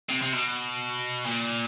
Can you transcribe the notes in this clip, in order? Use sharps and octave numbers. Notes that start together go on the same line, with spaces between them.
C3
C3
B2
A#2